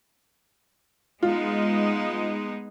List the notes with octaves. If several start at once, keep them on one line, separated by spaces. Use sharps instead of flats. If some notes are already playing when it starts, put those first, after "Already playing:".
G#3 B3 D#4 F4